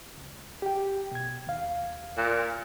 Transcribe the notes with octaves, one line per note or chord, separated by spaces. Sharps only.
C#2
G4 G5
B2 G#6
D#2 F5
A#2